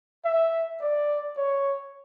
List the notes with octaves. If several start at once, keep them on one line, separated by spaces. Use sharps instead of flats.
E5
D5
C#5